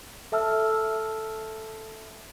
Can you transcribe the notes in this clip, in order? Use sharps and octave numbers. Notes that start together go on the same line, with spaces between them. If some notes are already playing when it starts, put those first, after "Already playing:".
A4 E5 A5 E6 F6